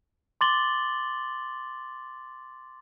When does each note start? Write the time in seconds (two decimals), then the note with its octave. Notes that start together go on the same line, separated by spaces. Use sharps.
0.41 C6 D6 A6 F#7 G7